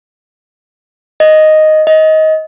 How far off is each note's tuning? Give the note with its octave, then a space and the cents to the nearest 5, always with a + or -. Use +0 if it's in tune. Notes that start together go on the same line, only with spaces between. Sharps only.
D#5 +0
D#5 +20